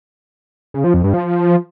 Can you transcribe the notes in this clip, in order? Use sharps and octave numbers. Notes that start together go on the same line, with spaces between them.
C#3
F3
F2
G2
F3